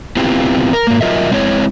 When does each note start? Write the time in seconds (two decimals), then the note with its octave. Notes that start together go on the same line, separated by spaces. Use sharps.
0.17 B3 C4 E4 F4 G4
0.73 A#4
0.87 G#2 A#3
1.01 F#3 F4 A#4 D#5 E5
1.31 G#3 C4 E4 C#5